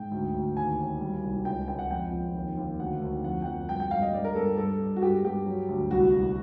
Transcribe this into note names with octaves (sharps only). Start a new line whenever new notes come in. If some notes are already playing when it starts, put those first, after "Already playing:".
Already playing: G#2 G5
D2
D2
D#2 G#5
D#2
G3
C2
C#2 G5
C#2 G5
F#5
F2 G5
F2
D#2
D#2
D2 F#5
D2
F2 F#5
G5
F2 F#5
G2 G5
G5
G2 F5
D#5
G2 D5
A#4
G2 A4
G2 A4
G2
F#4
G2 G4
G2 G4
F#3
D2
C2 F#4
C2